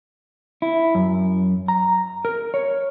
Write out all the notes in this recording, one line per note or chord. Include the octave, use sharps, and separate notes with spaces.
E4
F#2
A#5
A#4
C#5